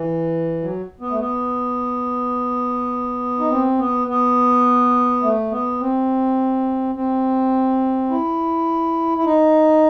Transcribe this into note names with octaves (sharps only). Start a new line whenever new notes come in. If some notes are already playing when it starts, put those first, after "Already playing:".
Already playing: E3
F#3
B3
A3
B3
D#4
C4
B3
B3
A3
B3
C4
C4
E4
E4
D#4